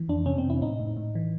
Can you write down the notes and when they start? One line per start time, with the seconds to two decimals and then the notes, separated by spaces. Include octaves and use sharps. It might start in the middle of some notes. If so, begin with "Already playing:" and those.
Already playing: E3
0.09 F2 D4
0.26 C3 C#4
0.38 C4
0.44 C3
0.50 E4
0.62 A2 D#4
0.80 A2
0.97 A2
1.15 E3